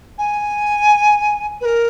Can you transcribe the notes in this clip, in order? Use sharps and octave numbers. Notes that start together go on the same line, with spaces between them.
G#5
B4
A#4